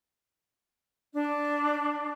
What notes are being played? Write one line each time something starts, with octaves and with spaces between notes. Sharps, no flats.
D4